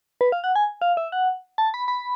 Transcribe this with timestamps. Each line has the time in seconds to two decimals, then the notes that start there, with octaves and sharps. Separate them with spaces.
0.21 B4
0.32 F5
0.44 F#5
0.56 G#5
0.82 F5
0.97 E5
1.12 F#5
1.58 A5
1.74 B5
1.88 B5